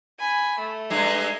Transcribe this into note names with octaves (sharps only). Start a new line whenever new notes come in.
G#5 B5
A3
G2 G#3